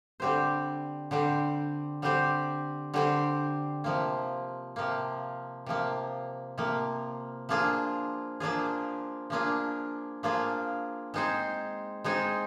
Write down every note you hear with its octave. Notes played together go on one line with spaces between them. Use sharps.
D3 G3 C4 G4 C5
D3 G3 C4 G4 C5
D3 G3 C4 G4 C5
D3 G3 C4 G4 C5
C3 F3 A#3
C3 F3 A#3
C3 F3 A#3
C3 F3 A#3
F3 A#3 D4 F4 G#4
F3 A#3 D4 F4 G#4
F3 A#3 D4 F4 G#4
F3 A#3 D4 F4 G#4
G#3 C4 D#4 G#4 C5
G#3 C4 D#4 G#4 C5